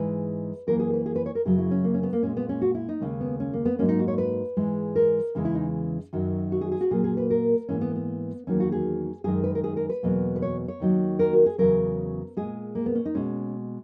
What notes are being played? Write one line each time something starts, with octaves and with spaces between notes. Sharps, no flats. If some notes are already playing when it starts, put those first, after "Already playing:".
Already playing: G#2 E3 G#3 B4
F#2 E3 A#3 A#4
G#4
B4
G#4
B4
C#5
A#4
F#2 C#3 F#3 G#4
E4
C#4
A#3
C#4
B3
A#3
A#2 G#3 C#4
B3
C#4
F#4
E4
D#4
D#2 C#3 G#3 C#4
B3
C#4
A#3
B3
G#2 F#3 A#3 C#4
D#4
F#4
C#5
B4
G#2 E3 G#3
A#4
E2 C#3 E3 G#3
E4
D#4
F#2 D#3 F#3
F#4
G#4
G#4
F#4
A#2 F#3 A#3 G#4
G#4
B4
A#4
G#2 E3 A#3 C#4
B3
B3
E2 D#3 F#3 A#3 C#4
F#4
G#4
F#2 D#3 G#3 G#4
B4
A#4
G#4
A#4
B4
E2 B2 F#3 A#3
B4
C#5
C#5
D#2 D#3 F#3
A#4
F#4
G#4
E2 C#3 F#3 A#4
A#2 G#3 G#4
A#3
B3
C#4
D#4
B2 G#3 C#4